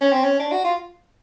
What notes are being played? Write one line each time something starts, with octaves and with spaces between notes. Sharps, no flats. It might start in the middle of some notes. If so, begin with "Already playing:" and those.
C#4
C4
C#4
D4
F#4
F4